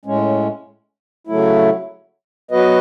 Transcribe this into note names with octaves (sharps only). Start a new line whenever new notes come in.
A2 G#3 C#4
C#3 F#3 A3 E4
F#3 B3 F#4 B4 D#5